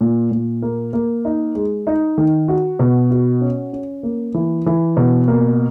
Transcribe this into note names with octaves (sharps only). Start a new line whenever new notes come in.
A#2
A#2
A#3
A#3
D#4
G#3
D#4
D#3
F#4
B2
F#4
C#4
C#4
A#3
E3
E3
B2
A#3